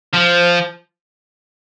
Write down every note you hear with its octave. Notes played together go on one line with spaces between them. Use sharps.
F3